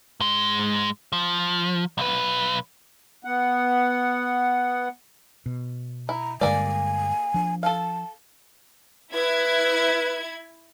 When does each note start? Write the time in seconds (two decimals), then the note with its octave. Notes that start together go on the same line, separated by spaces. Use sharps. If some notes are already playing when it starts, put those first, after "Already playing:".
0.20 G#2 G#3
1.12 F3
1.98 B1 B4
3.24 B3 F#5
5.46 B2
6.09 E4 A#5
6.41 G2 D3 G#3 A#3 D5 G#5
7.34 F3 D4
7.63 A4 F5 A5
9.14 E4 B4 G#6